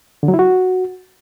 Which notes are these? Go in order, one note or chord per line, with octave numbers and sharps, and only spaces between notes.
D3
F#3
E4
F#4